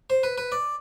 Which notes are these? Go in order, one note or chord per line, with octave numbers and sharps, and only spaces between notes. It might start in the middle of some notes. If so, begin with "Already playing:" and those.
C5
B4
B4
D5